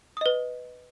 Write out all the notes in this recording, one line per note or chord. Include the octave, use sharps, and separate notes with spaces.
B4 D#5 D#6